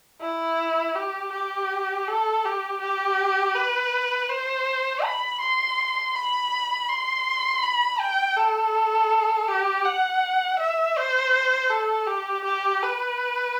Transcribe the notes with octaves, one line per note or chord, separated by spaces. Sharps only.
E4
G4
G4
A4
G4
G4
B4
C5
B5
C6
B5
C6
B5
G5
A4
G4
F#5
E5
C5
A4
G4
G4
B4